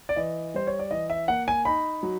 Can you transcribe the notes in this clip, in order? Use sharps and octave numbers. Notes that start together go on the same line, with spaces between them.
D5
E3 D#5
G3 C5
C#5
D5
E3 D#5
E5
A#3 F#5
G#5
D#4 B5
F#3